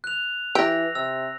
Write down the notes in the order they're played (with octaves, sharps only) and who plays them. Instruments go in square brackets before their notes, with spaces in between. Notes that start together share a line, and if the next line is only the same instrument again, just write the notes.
[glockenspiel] F#6 F7
[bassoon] E3 [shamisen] G4 [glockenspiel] E6 A#6
[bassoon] C3 [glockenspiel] E6